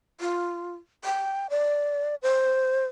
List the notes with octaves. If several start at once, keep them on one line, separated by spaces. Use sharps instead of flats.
F4
G5
D5
C5